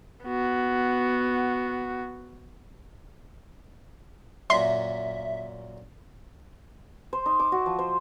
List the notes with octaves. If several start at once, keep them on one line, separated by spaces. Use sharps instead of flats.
B3 F#4
F#2 A#2 E5 C6
C5
D#4
D6
F#4
F3
C5